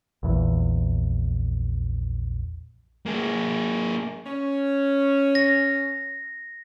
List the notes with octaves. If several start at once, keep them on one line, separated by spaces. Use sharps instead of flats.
A#1 E2
A#3 G#4
C#4
A#6